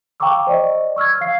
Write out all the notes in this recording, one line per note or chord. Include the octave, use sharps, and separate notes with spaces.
F5 G5 A#5 C#6 D6 E6
C5 D5 D#5
C#6 E6 F6 G#6
F5 C7